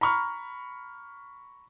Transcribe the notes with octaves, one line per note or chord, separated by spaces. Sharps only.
A#5 B5 C#6 F6